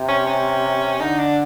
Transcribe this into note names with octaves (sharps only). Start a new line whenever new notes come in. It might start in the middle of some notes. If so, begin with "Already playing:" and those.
Already playing: C3
C#4
C#4
D3 D#4
D4